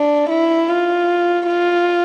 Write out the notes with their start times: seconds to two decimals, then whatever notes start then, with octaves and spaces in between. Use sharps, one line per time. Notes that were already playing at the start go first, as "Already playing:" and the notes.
Already playing: D4
0.30 E4
0.68 F4
1.47 F4